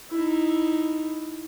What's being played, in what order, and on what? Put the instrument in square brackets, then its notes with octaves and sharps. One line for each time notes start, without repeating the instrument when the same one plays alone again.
[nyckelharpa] D#4 E4